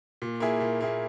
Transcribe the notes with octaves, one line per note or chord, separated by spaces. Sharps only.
A#2
A#3 E4 G#4
A#2
A#3 E4 G#4